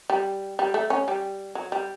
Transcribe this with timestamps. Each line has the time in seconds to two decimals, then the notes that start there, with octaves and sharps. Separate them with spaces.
0.10 G3
0.59 G3
0.74 A3
0.90 C#4
1.08 G3
1.55 F#3
1.72 G3